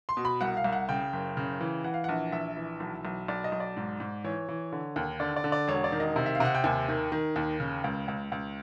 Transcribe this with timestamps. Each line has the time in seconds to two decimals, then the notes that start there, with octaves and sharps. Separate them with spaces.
0.09 C6
0.17 B2
0.25 B5
0.41 C2 F#5
0.57 F5
0.64 C2
0.73 F#5
0.89 C#3 G5
1.13 F#1
1.37 C#3
1.61 E3
1.84 E3 F#5
1.94 F5
2.04 A#1 F#5
2.32 A#1 E5
2.57 E3
2.80 B1
3.05 B1
3.28 B1 D5
3.44 D#5
3.52 B1
3.60 D5
3.77 G#2
4.00 G#2
4.24 E3 C#5
4.49 E3
4.72 D3
4.96 D#2
5.20 D3 D5
5.36 D5
5.44 D3
5.52 D5
5.68 E1 C#5
5.84 D5
5.92 D#3
6.00 D#5
6.16 C3
6.26 E5
6.35 F5
6.40 C3 F#5
6.55 G5
6.64 D#2 G#5
6.88 D#3
7.12 D#3
7.36 D#2
7.60 C#3
7.84 C#2
8.08 C#2
8.32 C#2